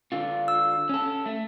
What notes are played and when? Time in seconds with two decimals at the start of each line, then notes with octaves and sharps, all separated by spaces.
0.12 D3 F4
0.48 E6
0.89 C#4 A4
1.26 A3